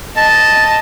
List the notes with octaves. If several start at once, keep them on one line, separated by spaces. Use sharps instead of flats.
D#5 A5